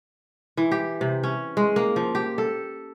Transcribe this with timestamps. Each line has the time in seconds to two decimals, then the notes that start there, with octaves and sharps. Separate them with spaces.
0.57 E3
0.71 G4
1.01 C3
1.23 C#4
1.57 G#3
1.76 A#3
1.96 F3
2.15 G4
2.38 A4